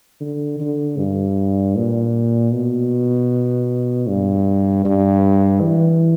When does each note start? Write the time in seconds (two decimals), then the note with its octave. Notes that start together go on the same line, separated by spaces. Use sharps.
0.21 D3
0.60 D3
0.98 G2
1.76 A#2
2.53 B2
4.08 G2
4.85 G2
5.61 E3